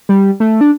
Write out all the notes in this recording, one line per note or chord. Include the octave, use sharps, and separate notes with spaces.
G3
A3
D4